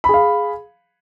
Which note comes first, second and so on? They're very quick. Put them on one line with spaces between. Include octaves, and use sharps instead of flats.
B5 G#4 F5